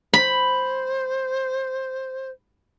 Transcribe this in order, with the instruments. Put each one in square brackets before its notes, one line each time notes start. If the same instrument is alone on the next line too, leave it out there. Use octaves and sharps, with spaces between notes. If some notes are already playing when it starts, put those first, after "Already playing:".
[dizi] C5 [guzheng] B5